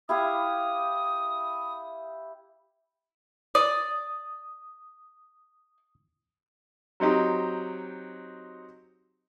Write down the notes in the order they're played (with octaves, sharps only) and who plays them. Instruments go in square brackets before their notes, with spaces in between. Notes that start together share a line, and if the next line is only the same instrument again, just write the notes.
[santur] E4 G4 F5 [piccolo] D#6
[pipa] D5 [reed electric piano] D#6
[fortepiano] F#3 C4 D#4 G4